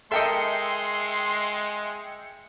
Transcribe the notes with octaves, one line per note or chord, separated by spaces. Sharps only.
G#3 A4 A#4 D#5 E5 G5 C6 C#7